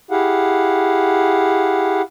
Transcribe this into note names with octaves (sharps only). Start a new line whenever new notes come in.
E4 G4 G#4 F5 F#5